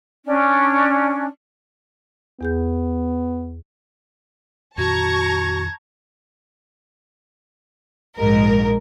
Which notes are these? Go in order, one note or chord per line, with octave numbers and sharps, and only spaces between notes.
C#4 D4
E2 B3 G#4 G6
F2 A#2 D#3 F#4 A5 A#5 C#6 G#6
A#1 G#2 A#4